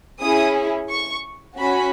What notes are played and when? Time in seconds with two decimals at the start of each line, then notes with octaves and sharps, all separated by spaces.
0.20 C#4 E4 G#4 D#6
0.90 C#6
1.57 C#4 F#4 B5